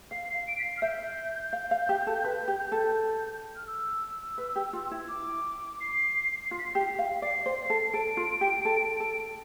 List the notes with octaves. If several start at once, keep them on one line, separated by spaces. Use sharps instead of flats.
F5 C7
C7
D7
B6
C7
F6
E5 G6
F5
F5
G4
A4
B4
G4
A4
F6
E6
B4
G4
F4
E4
D6
C7
F4 C7
B6
C7
G4
F5
D5 C7
C5
A4
A4 D7
F4
G4
A4
A4